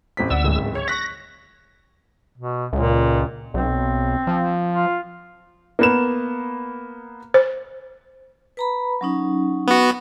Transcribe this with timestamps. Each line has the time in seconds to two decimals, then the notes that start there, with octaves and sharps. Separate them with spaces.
0.17 A1 C4 B6
0.30 D2 D5 F#5 E6
0.44 D1 G#1 C#2
0.75 C#5
0.88 C#6 F#6 A#6 B6
2.38 B2
2.73 C#2 A#2
3.54 B1 C4
4.27 F3
4.73 F4
5.79 A#3 B3 E7
7.34 C5
8.57 B4 A#5 B5
9.01 F#3 C#4 D#4
9.67 B3 F#4